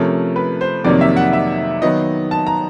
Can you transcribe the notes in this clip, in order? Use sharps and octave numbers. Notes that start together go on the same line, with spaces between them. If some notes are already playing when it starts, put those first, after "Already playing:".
Already playing: C3 F3 A3 C#4 A#4
B4
C5
F2 C3 D#3 F#3 A#3 D5
E5
F#5
E5
D#3 F#3 B3 D#5
A5
A#5